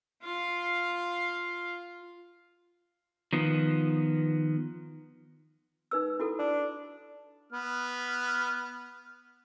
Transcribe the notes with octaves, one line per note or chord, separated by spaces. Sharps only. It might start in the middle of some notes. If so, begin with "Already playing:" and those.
F4 F5
D#3 F3 B3
D#4 B4 E6
E4 F#4 A4
D4
B3 F6